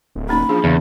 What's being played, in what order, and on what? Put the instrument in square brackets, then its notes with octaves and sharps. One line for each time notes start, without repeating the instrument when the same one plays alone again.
[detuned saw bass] D1
[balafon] A#3 C#4 D#4 [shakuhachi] B5
[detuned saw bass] F3 [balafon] D4 G#4
[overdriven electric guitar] E2 [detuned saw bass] C#3